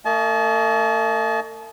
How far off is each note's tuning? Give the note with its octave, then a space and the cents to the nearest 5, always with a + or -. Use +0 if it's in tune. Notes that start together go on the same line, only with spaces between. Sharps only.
A3 +45 D#5 +0 A5 -40